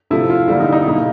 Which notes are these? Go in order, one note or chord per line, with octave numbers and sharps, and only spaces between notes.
C3 F3 A3 E4
F4
D3 G3 A#3 E4
D#4
D#4
B2 G3 A#3